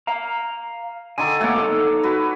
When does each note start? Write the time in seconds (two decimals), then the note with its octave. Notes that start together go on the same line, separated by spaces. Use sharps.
0.07 F5 A#5
1.18 D3 D#3 A4 G#5
1.41 A3 A#3 C#5 F#5 D6
1.56 D#4 A4
2.03 F#4 B4